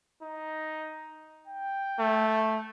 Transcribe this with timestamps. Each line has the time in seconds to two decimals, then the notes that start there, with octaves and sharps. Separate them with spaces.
0.23 D#4
1.48 G5
1.99 A3